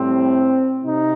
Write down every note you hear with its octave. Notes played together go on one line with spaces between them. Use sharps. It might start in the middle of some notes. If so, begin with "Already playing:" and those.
Already playing: A2 G3 C4
C3 D#4